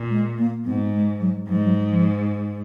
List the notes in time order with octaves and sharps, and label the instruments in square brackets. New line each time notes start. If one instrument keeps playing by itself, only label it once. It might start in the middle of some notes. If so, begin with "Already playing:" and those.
Already playing: [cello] A#2
[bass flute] G#3
A#3
[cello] G#2 [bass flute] B3
[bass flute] G#3
F#3
[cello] G#2 [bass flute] F#3
[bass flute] G#3
F#3
F3